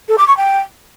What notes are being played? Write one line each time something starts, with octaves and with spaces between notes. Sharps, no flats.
A4
D6
C#6
G5